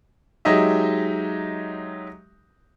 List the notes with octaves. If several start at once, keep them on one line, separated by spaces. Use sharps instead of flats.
F#3 G#3 D#4 G4 D#5 E5